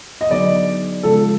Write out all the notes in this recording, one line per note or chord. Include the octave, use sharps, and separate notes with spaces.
D#5
D3 F#3 B3 D#4 G#4 D5
C#3 F3 G#3 C#4 F4 A4